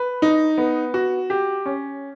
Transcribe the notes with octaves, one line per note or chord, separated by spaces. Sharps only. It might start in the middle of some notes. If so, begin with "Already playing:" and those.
Already playing: B4
D#4
B3
F#4
G4
C#4